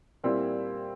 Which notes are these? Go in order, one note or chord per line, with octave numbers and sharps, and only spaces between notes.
A#2 G3 C4 E4